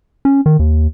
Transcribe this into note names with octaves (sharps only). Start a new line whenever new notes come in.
C#4
D#3
D#2